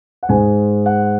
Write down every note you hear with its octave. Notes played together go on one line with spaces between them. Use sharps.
F#5
G#2 G#3 G#5
F#5